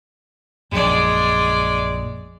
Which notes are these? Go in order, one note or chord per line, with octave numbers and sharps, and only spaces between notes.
A#1 F#2 G#3 D5